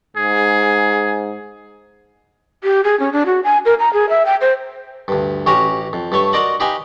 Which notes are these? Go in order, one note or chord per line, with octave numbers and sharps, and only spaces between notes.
G#2 G#4
G4
G#4
C#4
D4
F#4
G#5
A#4
A#5
G#4
E5
G5
C5
D2 G2
A1 C#4 F#4 G4 C#5 A#5
F2
G2 A3 C#5 C#6
F#4 A#4 C5 D5 D#5 F#5
D#4 G4 B4 D#5 F5 G#5